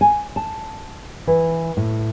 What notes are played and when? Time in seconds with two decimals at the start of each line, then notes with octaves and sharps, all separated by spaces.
0.01 G#5
0.36 A5
1.27 E3
1.77 A2